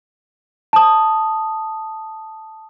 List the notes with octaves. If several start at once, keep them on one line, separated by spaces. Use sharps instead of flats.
A5 D#6